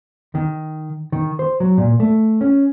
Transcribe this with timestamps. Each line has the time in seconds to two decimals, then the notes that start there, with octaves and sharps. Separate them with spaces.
0.35 D#3
1.12 D#3
1.39 C5
1.60 F#3
1.78 A#2
2.00 A3
2.41 C#4